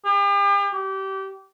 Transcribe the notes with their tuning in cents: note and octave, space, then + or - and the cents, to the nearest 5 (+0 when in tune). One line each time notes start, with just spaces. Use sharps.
G4 +40
G4 -25